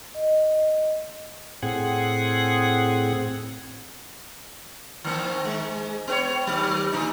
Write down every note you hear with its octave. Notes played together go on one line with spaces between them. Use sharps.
D#5
A2 C4 G#4 F#5
D#3 A#3 C4
G#2 G#3
B3 B4 C#5
D#2 F#3
A2 D3 D#4